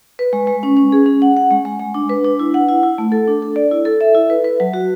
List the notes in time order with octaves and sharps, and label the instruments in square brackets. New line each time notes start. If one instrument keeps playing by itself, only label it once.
[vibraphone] B4
G#3
G#3
C#4
C#4
G#4
C#4
F#5
F#5
G#3
G#3
G#3
D4
B4
D4
E4
F#5
E4
E4
A3
A4
D4
A4
D5
E4
A4
E5
E4
B4
B4
F#3
F#4